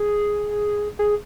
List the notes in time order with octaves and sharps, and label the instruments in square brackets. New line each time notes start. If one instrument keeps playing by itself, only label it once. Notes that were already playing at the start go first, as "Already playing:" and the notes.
Already playing: [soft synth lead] G#4
G#4